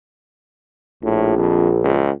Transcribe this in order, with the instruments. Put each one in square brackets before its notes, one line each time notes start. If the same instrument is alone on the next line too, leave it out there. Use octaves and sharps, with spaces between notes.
[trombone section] A#1 [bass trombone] A2
[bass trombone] F2
C#2